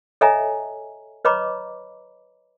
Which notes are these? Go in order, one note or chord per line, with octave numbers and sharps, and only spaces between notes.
A4 C#5 D#5 E5 G#5 A#5
B4 C#5 D#5 A#5 B5 D6